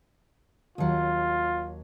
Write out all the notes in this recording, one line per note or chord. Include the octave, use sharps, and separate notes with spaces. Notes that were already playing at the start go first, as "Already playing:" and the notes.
D#2 F#3 F4